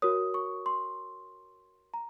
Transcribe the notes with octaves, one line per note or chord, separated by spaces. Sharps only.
F#4 A#4 C#5 D#6
C#6
C6
A#5